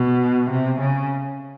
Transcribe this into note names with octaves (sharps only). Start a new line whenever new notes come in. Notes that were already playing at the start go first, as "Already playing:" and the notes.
Already playing: B2
C3
C#3